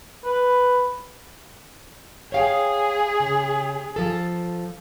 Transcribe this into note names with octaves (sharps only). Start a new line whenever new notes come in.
B4
G#4 C#5 F5 G5
C#3
F3 A4